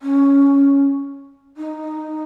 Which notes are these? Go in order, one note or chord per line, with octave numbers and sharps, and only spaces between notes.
C#4
D#4